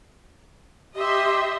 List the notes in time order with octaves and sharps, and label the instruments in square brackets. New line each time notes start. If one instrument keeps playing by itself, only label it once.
[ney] G4 [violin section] D#5 E5 C6